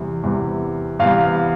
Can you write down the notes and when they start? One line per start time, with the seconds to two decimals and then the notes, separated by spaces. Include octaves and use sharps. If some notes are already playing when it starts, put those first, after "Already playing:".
Already playing: E2 C3 G3
0.23 E2 C3 G3
0.99 E2 C3 G3 F5